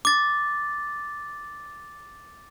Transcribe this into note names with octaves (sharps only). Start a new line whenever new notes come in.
D6 A6